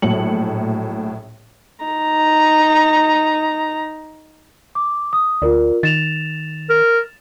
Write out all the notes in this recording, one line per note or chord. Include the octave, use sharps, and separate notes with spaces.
A#1 A2 F#3 C#7 F#7
D#4 A#5
D6
D#6
D2 F4 A#4 D5
D#3 A6 E7 F7
A#4